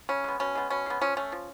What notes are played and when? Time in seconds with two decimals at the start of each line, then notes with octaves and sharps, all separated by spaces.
0.09 C#3 C#4
0.24 G#3 B3
0.40 B2 C#4
0.55 G#3 B3
0.70 B2 C#4
0.86 G#3 B3
1.02 F3 C#4
1.17 A3 C#4
1.32 F3